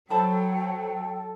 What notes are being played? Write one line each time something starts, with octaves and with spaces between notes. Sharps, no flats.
F#3 A4 C5 G5 A5 B5